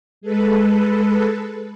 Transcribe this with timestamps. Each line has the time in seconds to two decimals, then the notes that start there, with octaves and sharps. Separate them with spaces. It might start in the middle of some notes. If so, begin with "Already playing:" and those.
0.21 G#3 A4 B4